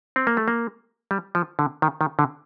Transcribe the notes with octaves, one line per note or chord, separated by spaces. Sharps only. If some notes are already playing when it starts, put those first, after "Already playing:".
C4
A#3
A3
A#3
G3
F3
D3
D#3
D#3
D3